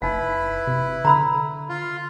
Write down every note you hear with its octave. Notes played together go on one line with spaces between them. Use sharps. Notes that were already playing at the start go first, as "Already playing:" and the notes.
F#1 D#4 E4 B4 F5
C3
D3 A#5 B5 E6
F4